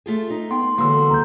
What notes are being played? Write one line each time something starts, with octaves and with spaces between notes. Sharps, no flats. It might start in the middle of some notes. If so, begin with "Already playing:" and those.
A3 F4 G#4
D#4
B3 G5 C6
D3 E3 F#3 G#3 A#3 C6 E6
C#2 A#5 G6